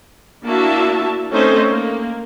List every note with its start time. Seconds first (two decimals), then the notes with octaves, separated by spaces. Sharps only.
0.45 A#3 D4 E4 F#4 E5 A5
1.31 A3 C4 C#4 D#4 A4 C5
1.68 A#3